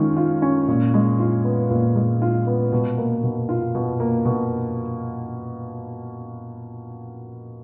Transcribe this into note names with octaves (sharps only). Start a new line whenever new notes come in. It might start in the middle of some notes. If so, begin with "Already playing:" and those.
Already playing: D#3 G#3 C#4 F4
F4
C#4
A#2
G#3
F4
B3
A#2
G#3
F4
B3
B2
A#3
B2
F4
B2
A#3
B2